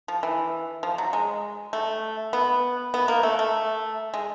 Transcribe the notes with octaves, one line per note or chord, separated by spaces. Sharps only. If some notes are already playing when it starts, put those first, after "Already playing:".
F3
E3
F3
F#3
G#3
A3
B3
B3
A#3
A3
A3
G#3